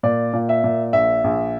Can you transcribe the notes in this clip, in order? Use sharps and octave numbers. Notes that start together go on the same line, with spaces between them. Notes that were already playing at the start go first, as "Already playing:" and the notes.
A#2 D5
A#2
E5
A#2
A#1 E5
A#1